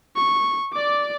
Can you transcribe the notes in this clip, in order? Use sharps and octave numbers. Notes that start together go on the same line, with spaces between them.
C#6
D5 D6